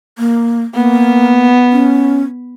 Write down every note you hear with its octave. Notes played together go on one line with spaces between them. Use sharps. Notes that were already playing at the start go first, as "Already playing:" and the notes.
A#3
A#3 B3
C#4